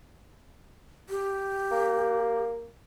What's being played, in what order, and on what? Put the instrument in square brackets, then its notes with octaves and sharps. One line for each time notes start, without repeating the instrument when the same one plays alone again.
[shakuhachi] G4
[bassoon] A#3